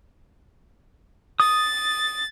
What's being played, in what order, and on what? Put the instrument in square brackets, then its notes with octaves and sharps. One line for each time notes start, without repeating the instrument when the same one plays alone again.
[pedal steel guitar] D#6 [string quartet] A6